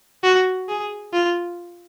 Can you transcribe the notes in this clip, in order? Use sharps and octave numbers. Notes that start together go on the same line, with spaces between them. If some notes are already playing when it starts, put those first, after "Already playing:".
F#4
G#4
F4